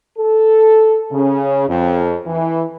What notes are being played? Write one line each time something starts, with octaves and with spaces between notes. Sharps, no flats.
A4
C#3
F2
E3